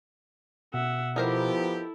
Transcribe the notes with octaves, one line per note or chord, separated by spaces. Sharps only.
B2 E5 F#5
F3 B3 D#4 E4 G4 A4 A#4 C5